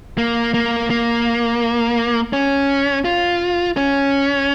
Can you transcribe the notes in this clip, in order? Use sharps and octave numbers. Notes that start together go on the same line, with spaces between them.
A#3
A#3
A#3
C#4
F4
C#4